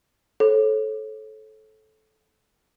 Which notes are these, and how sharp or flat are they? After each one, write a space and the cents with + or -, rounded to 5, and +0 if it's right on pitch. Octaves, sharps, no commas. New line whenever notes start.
A4 -15 C#5 -40